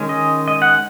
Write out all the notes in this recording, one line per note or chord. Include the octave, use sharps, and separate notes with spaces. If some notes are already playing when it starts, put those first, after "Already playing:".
Already playing: D#3 G#3 C#4
D#5
D#5
F#5